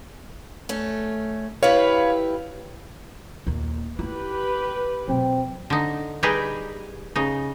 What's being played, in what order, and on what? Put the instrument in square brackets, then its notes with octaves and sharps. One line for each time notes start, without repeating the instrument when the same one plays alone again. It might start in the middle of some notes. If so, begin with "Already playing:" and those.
[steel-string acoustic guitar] A3 C#4
[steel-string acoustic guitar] E4 G4 B4 [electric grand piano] C#5 F5
[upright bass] D#2 A#2
[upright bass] E4 F4 [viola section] G4 B4
[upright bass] B2 F#3 [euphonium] C4
[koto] D3 D#4
G3 D#4 G4 G#4 B4
C#3 D#4